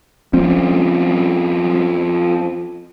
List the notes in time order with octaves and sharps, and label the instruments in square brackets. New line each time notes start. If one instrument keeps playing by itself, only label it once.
[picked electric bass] F3 C4 C#4